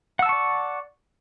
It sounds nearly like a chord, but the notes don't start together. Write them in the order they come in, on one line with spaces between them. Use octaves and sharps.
F#5 E6 A5 C#6 D5